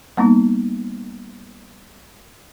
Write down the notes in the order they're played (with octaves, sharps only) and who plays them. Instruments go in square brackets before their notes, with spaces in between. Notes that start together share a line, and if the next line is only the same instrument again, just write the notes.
[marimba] G3 A#3 B3 D#4